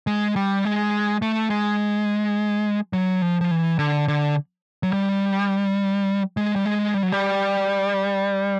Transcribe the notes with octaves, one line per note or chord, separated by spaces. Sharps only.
G#3
G3
G#3
A3
G#3
F#3
F3
F3
E3
D3
D3
F#3
G3
G#3
G3
G#3
G3
F#3
G3